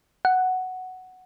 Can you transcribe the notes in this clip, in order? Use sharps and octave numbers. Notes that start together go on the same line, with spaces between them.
F#5